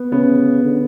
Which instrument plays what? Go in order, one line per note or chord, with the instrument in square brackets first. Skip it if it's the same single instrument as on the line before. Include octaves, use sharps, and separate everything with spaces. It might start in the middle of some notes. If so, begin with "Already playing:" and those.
Already playing: [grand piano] B3
[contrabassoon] C#3 [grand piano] B3
[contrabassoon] D3